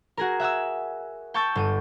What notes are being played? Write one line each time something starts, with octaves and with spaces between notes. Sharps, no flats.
F#4 G#4 A#4
E5 F#5 G#5 E6
G5 A5 C#6 E6 G6 A6
G1 G5 D#7